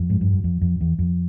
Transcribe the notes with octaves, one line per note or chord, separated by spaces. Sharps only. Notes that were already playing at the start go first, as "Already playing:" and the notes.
Already playing: F2
G#2
G2
F#2
F2
F2
E2
F2